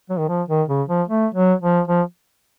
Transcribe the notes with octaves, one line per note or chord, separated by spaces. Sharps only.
F#3
D#3
F3
D#3
C#3
F3
A3
F#3
F3
F3